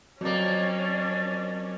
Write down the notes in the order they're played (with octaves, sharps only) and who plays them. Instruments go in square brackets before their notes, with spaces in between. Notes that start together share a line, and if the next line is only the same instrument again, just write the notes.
[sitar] F2 A#3 [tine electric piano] F#3 [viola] C#4 D4 [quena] D5